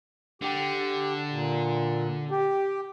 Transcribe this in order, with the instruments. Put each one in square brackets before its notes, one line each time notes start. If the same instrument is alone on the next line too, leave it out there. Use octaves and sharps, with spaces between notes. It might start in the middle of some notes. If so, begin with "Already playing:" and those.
[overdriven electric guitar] D3 [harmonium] G4
[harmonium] A#2
G4